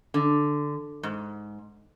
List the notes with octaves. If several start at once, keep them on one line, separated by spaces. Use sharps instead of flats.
D3
G#2